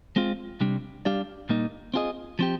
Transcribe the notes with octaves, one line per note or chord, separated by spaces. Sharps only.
G#3 C4 F4
C3 G3 D4
G3 D4 G4 D5 F5
A#2 G3 A#3 D#4
C4 F4 G#4 D#5
F3 C4 G4